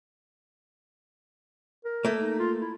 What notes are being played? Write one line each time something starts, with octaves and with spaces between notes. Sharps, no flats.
A#4
A3 A#3
D#4
F4
E4